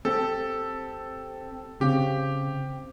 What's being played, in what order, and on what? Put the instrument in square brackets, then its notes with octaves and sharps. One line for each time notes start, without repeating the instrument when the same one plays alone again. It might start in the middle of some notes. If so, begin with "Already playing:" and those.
[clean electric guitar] C4 G4 [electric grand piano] A4
[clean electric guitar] C#3 [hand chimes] C4 [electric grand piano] G4